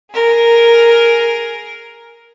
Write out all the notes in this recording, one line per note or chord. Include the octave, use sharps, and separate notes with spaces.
G#4 A#4